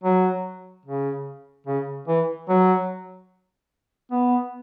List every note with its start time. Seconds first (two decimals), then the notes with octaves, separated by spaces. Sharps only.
0.04 F#3
0.86 C#3
1.67 C#3
2.08 E3
2.49 F#3
4.11 B3